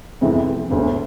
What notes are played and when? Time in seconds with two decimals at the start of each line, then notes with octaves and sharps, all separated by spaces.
0.21 F2 C3 E3 G#3 B3
0.70 E1 D2 D3